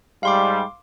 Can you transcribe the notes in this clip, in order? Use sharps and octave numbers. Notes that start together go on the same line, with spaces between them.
G#2 G3 F5 C6 D6